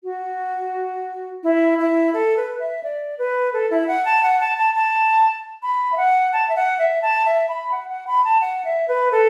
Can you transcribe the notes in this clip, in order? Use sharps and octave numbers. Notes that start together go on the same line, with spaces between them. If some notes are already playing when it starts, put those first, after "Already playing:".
F#4
E4
E4
A4
B4
E5
D5
B4
A4
E4
F#5
A5
F#5
A5
A5
A5
B5
E5
F#5
A5
E5
F#5
E5
A5
E5
B5
F#5
F#5
B5
A5
F#5
E5
B4
A4